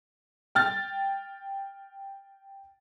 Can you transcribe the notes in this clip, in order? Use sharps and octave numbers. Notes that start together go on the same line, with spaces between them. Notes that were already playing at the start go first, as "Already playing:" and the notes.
G5 F6 A6